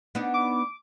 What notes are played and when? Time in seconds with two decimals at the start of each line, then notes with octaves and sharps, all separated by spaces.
0.15 B3 D4 D#4
0.34 D6